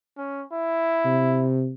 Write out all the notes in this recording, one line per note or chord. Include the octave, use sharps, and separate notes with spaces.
C#4
E4
C3